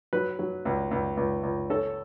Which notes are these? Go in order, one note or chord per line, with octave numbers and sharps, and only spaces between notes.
F#3 B4
F#3
C#2
C#2
C#2
C#2
C#4 A4